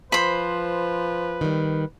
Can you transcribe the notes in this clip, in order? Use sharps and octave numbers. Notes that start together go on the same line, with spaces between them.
F3 B4 C5 B5
D#3 G3